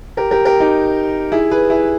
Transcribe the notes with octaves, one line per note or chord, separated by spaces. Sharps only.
G4 A#4
G4 A#4
G4 A#4
D#4 G4
E4 G#4
G#4 B4
E4 G#4